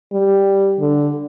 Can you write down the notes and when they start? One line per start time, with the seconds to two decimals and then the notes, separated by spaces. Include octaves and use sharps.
0.13 G3
0.80 D3